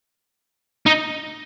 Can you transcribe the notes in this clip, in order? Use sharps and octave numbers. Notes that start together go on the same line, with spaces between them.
D#4